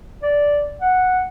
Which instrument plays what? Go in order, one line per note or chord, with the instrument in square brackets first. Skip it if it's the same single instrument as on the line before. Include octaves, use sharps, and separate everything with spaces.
[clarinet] D5
F#5